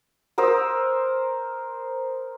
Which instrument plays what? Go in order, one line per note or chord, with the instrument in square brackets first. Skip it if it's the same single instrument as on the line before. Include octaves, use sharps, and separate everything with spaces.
[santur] A#4 C5 D#6 E6